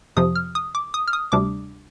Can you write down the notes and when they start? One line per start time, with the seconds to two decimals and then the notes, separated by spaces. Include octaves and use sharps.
0.16 F2 C3 F3 D#6
0.36 F6
0.55 D#6
0.75 D6
0.94 D#6
1.08 F6
1.13 D#6
1.32 D2 C3 G3 D4 D6